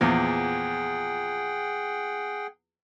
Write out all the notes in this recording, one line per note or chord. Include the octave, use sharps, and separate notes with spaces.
E2 A#2 F3 G#4 F#5 G5